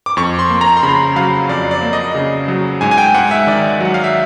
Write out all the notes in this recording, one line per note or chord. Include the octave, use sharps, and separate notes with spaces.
D6
F2 C#6
C6
A#3
A#5
C6
C#3 B5
F#3 F5
F2 D5
D5
A#3
D#5
C#3
F#3
G#2 G#5
G#5
G5
G#2 F#5
E5
D#3 D5
F#3 F#5
F5
E5